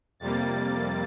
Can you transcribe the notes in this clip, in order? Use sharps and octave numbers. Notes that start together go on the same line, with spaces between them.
F2 C3 G3 A#3 A6